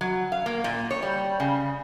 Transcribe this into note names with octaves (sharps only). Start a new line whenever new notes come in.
F#3
F5
A#3
A#2
C#5
G3
C#3